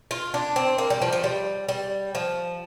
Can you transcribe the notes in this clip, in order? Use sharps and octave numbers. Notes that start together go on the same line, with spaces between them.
F4
D4
C4
A#3
G3
F3
F3
G3
G3
F3